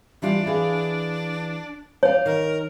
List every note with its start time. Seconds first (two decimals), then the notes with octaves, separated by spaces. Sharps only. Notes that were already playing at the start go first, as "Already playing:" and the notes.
0.22 E3 G3 D4 F4
0.46 E3 G#4 F5
2.03 C#5 D5 F5
2.26 D#3 A#4